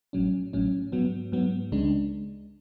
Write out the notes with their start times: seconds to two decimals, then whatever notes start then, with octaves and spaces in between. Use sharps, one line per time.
0.13 A1 A2 F#3 C#4
0.53 A1 A2 F#3 C#4
0.92 G#2 F#3 B3
1.32 G#2 F#3 B3
1.72 C#2 C#3 G#3 D4